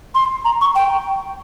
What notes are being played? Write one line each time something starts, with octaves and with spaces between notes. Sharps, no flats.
C6
A#5
C#6
G5